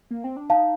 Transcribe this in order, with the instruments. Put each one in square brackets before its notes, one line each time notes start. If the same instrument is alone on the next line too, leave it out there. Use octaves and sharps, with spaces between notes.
[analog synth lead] A#3
C4
D4
[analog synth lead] D#4 [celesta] F5 A5